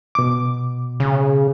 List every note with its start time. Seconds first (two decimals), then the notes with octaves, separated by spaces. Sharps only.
0.15 B2 D6
1.00 C#3